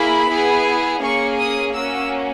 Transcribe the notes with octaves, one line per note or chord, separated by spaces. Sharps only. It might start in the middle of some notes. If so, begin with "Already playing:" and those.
Already playing: A#3 E4 G#4 B5
B3 E4 G#4
A#3 C#4 G#4 C#6
D#6
A#3 C#4 F#4 E6